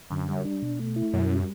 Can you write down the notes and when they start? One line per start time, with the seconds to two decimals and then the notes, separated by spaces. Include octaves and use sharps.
0.10 F#2 D3
0.29 G3
0.45 D4
0.62 B2
0.80 A3
0.96 E4
1.13 F#2 B2
1.30 G3